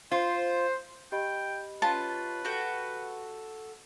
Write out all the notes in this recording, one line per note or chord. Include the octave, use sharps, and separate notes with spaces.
F4 C5
G4 D#5 G5 B5
C#4 F4 B4 A5
F#4 A4 G5